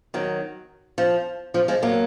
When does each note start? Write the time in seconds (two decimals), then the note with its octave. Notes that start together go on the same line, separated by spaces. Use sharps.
0.14 D#3 F#3
0.98 F3
1.54 F3
1.68 F3 G#3
1.82 F#3 A#3